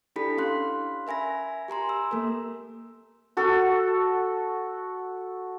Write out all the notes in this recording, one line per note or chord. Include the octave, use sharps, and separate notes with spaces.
D4 E4 G4 A4 B5 B6
C#4 F5 C6 F#6
A#4 E5 G#5 B5 A#6
G4 G#5 A#5 C6
E6
A#3 A4 A#4
F#4 A4